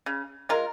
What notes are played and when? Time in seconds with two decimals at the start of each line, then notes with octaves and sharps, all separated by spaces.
0.06 C#3
0.49 G#3 F4 A#4